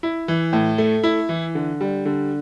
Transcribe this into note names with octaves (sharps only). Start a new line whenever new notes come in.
E4
E3
A2
A3
E4
E3
D3
G3
D3